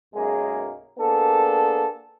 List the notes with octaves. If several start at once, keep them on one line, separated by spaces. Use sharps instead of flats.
B1 F#2 G#3 A#3 G#4
A#3 B3 D4 G#4 A4